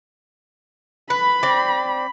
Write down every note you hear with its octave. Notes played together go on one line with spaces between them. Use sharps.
B4 B5
C4 D5